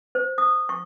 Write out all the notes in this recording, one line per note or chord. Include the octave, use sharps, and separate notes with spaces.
C5
D#6
C#6